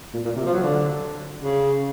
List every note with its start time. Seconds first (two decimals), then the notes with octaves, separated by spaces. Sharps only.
0.13 A#2
0.25 A#2
0.36 C3
0.45 F3
0.53 F#3
0.63 D3
1.41 C#3